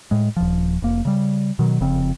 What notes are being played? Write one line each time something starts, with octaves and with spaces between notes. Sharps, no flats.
A2 G#3
D#1 F3
F1 A#3
C#3 G3
B2 D#3 F#3
F1 F2 C#3 C4